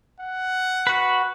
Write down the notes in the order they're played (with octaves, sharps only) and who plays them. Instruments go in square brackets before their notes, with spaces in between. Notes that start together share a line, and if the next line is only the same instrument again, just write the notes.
[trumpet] F#5
[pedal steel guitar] F#4 B4